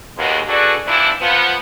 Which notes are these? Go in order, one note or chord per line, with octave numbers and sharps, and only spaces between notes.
D#2 B2 G#3
D4 F#4 G#4 A4 B4 D5
C3 E3 F3 D4 E4
F3 B3